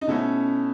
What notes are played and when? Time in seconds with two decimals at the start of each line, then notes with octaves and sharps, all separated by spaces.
0.01 D#4
0.07 B2 A3 C#4 E4